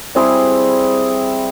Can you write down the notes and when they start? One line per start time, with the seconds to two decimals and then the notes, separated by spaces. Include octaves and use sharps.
0.15 G3 C4 E4 G#4